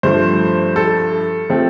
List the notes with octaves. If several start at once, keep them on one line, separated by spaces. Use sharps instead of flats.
G2 F3 A3 C5
A4
F3 A3 C4